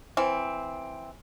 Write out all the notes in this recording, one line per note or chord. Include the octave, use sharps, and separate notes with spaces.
E3 C4